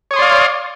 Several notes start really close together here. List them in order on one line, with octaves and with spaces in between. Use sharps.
C#5 D#6 C6 D5 F5